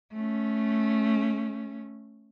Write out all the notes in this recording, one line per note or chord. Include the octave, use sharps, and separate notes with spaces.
A3 C#4